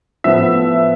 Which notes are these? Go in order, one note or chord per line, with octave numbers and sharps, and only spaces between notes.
A2 F3 B3 E5